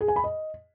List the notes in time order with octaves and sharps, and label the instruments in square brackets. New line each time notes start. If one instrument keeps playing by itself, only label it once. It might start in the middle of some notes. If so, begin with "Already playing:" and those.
[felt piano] G#4
G#5
B5
D#5